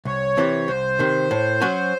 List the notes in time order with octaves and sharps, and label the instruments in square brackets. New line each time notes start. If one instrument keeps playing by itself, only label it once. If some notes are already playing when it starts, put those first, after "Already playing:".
[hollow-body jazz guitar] C2 [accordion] C#5
[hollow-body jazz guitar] C3 E3 C4
[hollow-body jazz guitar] C2 [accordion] C5
[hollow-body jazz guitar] C3 D#3
A2
F#3 C#4 F#4